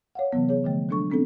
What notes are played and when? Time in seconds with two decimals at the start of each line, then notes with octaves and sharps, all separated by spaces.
0.15 C#5 F5 F#5
0.33 C3 E3 F#3 B3
0.49 G#4 C#5
0.64 D3 F3 A3
0.89 F#3 G#3 D4 A4 C#6
1.10 G#3 B3 C4 D4 D#4 A4